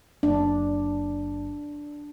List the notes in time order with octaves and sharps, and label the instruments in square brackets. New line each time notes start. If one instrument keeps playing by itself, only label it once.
[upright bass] F#1 [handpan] D4